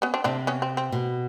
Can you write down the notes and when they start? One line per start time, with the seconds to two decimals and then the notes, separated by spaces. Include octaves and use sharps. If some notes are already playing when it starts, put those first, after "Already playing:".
0.02 B3 C#4
0.14 C4 D4
0.24 C3 C4 D4
0.47 B3 C#4
0.62 C4
0.77 C4
0.92 B2